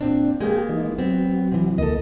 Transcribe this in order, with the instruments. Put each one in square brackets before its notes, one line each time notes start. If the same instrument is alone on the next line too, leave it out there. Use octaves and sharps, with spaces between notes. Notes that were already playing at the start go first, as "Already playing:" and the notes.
[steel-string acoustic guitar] A#2 C4 D4
[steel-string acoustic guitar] G#3 A#3 B3 [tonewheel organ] G4 G#4
[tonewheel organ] E3 D#4
[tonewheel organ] F#3 [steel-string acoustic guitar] B3 C4
[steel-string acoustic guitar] C3 E3
[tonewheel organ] D2 A#3 [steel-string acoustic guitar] A4 D#5